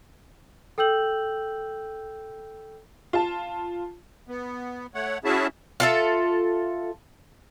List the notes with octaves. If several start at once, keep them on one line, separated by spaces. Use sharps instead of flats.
A4 G5 E6 G6 F#7
F4 A5
B3
A3 C#5 F#5
C#4 E4 F#4 G#4 E5 A5
F4 A4 E5